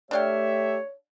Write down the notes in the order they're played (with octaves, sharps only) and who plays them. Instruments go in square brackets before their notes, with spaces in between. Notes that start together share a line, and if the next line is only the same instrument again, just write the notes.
[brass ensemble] A3 G4 E5 [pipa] D4 F5 G5 [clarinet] C#5